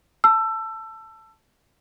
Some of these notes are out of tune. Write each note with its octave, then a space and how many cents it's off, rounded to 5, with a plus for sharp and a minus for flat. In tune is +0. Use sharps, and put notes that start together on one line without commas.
A5 +5 E6 +25